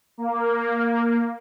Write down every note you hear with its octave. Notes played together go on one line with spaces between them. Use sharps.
A#3